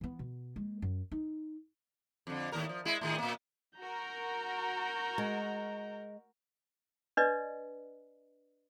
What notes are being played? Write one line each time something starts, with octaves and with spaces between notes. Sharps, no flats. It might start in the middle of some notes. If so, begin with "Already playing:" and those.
E3 B3
B2
G#3 A#3
F#2
D#4
F2 D3
D#2 A2 A#4
F3
G#3 E4
A2 D#3 G#4
A#2 A#3
F#4 A#4 A#5 G6
G#3
D4 B4 D5 D#5